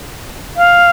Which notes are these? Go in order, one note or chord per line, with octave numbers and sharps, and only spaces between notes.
F5